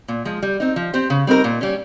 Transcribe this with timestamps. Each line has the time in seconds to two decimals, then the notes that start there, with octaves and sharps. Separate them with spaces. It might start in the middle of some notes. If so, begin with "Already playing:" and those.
0.08 A#2
0.25 F3 G#3
0.42 G3
0.60 C4 D#4
0.76 F3
0.93 C4 G4 C5
1.10 C#3
1.27 G3 C4 D#4 A#4
1.44 A#2
1.61 G3 C#4